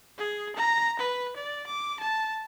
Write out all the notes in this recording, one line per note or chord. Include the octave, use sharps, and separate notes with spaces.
G#4
A#5
B4
D5
D6
A5